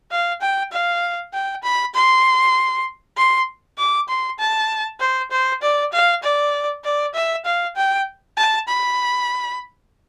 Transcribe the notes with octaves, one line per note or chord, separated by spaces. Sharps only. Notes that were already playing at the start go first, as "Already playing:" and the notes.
F5
G5
F5
G5
B5
C6
C6
D6
C6
A5
C5
C5
D5
F5
D5
D5
E5
F5
G5
A5
B5